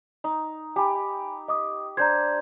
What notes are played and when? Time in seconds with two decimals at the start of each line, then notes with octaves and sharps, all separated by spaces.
0.24 D#4
0.76 G4 G#5 B5
1.48 D#5 D6 D#6
1.97 D4 C5 A#5 G6 G#6